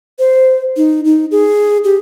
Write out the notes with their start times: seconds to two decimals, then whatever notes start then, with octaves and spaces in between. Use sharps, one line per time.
0.19 C5
0.77 D#4
1.05 D#4
1.31 G#4
1.84 G4